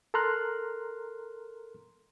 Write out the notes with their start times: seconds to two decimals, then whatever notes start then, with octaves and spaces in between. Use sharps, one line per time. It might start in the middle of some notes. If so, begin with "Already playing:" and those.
0.14 A4 A#4 A#5 C6 F6 F#6